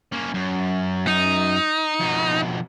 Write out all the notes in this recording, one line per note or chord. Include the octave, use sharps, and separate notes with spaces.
A#3 C#4
F#2
D#4
F2 B2